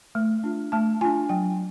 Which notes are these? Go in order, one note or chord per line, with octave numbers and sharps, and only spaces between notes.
A3
D4 F4
A3 A5
D4 F4 G#5
F#3 G5